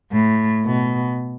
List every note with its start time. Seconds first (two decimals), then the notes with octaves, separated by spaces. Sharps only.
0.12 A2
0.65 B2